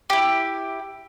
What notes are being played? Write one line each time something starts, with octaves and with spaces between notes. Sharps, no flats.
E4 G4